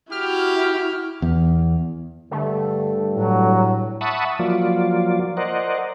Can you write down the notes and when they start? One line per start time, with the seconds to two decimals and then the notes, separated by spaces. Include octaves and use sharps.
0.12 E4 F#4 G4 F6
1.22 E2
2.31 G2 D3 A3
3.14 A2 F#3
4.01 E5 F#5 A5 B5 C#6 D#6
4.39 F3 F#3 A#3 F4 D5
5.37 A#4 C5 D5 D#5 F#5